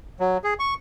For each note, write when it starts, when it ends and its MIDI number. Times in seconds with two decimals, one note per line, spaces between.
0.20 0.38 54
0.44 0.54 68
0.59 0.74 85